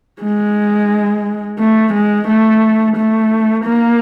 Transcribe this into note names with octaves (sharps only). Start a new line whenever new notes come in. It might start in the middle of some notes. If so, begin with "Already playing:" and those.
G#3
A3
G#3
A3
A3
A#3